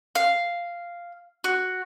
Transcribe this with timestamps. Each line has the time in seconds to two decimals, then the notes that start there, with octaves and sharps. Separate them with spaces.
0.15 F5
1.44 F#4